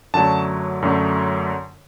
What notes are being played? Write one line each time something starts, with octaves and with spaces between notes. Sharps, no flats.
F#2 D3 F#3 A3 A5
F#2 D3 F#3 A3